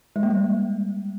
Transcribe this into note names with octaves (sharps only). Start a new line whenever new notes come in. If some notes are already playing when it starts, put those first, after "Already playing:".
G#3
A#3
G3